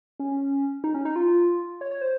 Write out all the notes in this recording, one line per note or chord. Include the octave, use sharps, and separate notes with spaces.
C#4
D#4
C#4
D#4
F4
C#5
C#5
C5